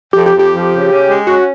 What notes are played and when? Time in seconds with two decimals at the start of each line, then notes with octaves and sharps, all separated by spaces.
0.13 F2 G4
0.26 G4
0.33 F2
0.39 G4
0.52 F3
0.70 C#3
0.90 C#4
1.08 G#3
1.27 C#4 F#4